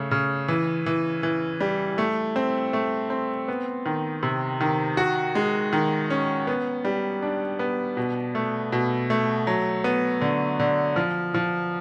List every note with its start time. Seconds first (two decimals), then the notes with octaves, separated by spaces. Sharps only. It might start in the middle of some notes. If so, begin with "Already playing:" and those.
Already playing: C#3 A3
0.11 C#3
0.48 E3
0.86 E3
1.23 E3
1.60 G3
1.98 A3
2.36 C4
2.73 A3
3.10 C4
3.48 B3
3.86 D#3
4.23 C3
4.61 D#3
4.97 F#4
5.35 G#3
5.73 D#3
6.10 C#4
6.47 B3
6.85 G3
7.22 D4
7.59 B3
7.97 B2
8.35 A3
8.72 B2
9.10 A3
9.47 F#3
9.84 B3
10.21 D3
10.60 D3
10.96 F3
11.34 F3